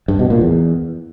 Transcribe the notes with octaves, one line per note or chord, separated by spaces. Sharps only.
G2
B2
A#2
E2